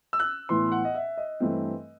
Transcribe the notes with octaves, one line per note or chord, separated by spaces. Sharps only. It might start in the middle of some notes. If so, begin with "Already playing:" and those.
E6
F#6
A2 E3 B3 C6
F#5
D#5
E5
D#5
G2 E3 A3 C4